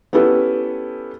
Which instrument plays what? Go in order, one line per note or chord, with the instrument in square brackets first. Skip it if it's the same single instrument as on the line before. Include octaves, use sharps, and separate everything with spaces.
[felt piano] B3 C#4 E4 G4 A4 B4